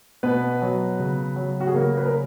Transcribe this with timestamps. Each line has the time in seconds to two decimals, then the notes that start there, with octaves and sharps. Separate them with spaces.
0.23 B2 B3 B4
0.62 F#3
0.99 C#3
1.36 F#3
1.61 F#4
1.67 G#4
1.74 C#3 A#3 A#4
1.97 B4
2.05 A#4